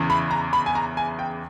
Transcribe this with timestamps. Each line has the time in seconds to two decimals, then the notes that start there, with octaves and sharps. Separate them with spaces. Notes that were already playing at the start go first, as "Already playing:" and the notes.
Already playing: E2 C#3 E3
0.10 B5
0.31 A#5
0.53 B5
0.66 G#5
0.75 A#5
0.97 G#5
1.19 G5